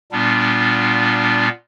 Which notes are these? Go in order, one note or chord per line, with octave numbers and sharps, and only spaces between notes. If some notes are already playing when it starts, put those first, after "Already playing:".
A#2 G3 B3 D4 F4